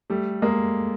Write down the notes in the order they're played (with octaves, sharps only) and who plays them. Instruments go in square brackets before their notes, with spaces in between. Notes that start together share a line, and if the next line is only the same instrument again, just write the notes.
[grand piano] G3 A3
G#3 A#3